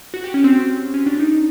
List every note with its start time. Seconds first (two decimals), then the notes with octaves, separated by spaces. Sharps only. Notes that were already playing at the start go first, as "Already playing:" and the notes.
0.14 F#4
0.24 G4
0.34 C#4
0.44 C4
0.94 C#4
1.06 D4
1.20 D#4